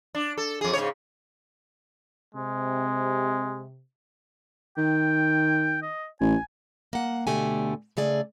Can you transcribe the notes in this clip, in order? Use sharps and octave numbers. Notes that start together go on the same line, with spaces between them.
D4
A4
F2 G#4
G#2 C#3 C#5
C3 G#3
D#3 G5
D#5
A1 G#5
A#3 F#5
D2 B2 D3 A3 G4 G#5
C#3 A3 G#4 D5